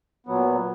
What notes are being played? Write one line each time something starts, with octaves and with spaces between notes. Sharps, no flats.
A#2 F#3 B3